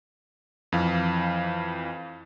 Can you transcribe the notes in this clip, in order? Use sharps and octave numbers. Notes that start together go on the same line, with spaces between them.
F2 E3 F5